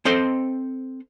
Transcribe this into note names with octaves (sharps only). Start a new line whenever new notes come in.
C4 A4 C5 D#5 C6